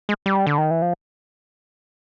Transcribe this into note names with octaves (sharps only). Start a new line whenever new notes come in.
G#3
G3
D3
D#3
E3
F3